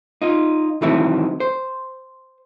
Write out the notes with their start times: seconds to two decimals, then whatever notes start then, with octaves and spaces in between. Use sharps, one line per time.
0.22 D#4 F4
0.82 D#3 E3 F#3 A3 C4 E4
1.40 C5